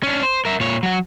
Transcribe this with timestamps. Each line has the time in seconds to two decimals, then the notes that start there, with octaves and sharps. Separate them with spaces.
0.03 C#4 D4
0.23 C5
0.45 A#4 E5
0.60 A#2 C#5
0.83 F#3 F#4